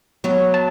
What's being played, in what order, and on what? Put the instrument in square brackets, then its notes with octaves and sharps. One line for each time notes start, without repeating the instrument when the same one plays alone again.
[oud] F#3 B3
[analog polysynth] A5